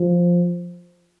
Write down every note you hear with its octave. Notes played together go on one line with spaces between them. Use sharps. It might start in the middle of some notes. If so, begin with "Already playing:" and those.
Already playing: F3